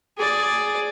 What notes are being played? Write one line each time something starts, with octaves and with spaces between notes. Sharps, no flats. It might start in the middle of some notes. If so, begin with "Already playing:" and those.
G#4 D5